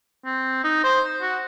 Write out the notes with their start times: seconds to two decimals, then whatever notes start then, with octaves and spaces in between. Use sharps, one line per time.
0.25 C4
0.64 D#4
0.84 C5
1.22 F#4